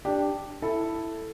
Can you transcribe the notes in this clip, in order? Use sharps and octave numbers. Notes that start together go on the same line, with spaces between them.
D4 G4
E4 A4